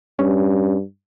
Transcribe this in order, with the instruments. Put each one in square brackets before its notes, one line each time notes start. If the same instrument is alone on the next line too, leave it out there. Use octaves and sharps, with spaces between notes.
[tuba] G2 [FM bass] C#4